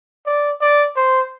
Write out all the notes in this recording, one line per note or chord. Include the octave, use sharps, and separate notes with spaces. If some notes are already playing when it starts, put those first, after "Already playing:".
D5
D5
C5